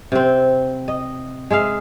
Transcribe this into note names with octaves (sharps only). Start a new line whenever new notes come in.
C3 C4
D#5
G#3 G#4 E5 F5